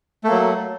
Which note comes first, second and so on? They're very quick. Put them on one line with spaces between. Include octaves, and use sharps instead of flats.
A3 A#3 F#3